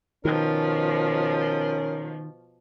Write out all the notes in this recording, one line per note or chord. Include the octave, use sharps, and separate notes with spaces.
B2 D#3 F3 C#4 A#4